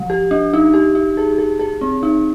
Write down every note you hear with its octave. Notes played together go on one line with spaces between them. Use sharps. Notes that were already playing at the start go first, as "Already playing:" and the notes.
Already playing: F3
G4
D4
D#4
G4
D#4
G#4
G#4
G#4
C4
D#4